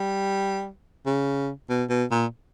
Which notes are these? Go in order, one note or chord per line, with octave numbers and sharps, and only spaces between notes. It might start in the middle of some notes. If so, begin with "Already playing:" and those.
Already playing: G3
C#3
B2
B2
A#2